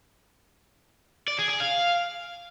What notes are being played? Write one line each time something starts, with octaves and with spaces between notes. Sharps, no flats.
D5
G#4
G#4
F5